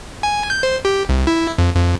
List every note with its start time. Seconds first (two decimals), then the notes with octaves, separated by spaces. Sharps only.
0.23 G#5
0.50 G6
0.63 C5
0.85 G4
1.09 C2
1.27 E4
1.58 F2
1.75 F2